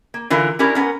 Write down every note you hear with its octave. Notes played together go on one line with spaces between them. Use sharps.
A#3
D3 E3 F4 A#4
C#4 D4 E4 G4 A#4
B3 C#4 A#4